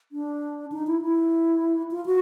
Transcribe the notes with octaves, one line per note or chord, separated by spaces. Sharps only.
D4
D#4
E4
E4
F4
F#4